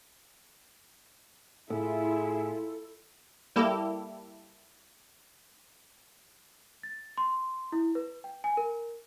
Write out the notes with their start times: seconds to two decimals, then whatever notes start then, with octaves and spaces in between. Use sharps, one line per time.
1.70 A2 E4 F4 G#4 A4 E5
3.56 G3 A#3 E4 G4 A4
6.83 A6
7.18 C6
7.72 E4
7.95 B4
8.24 G5
8.44 G#5
8.57 A#4